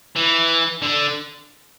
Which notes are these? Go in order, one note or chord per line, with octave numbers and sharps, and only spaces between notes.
E3
D3